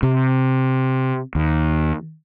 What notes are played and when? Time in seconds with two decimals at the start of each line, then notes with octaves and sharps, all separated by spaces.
0.03 C3
1.35 D#2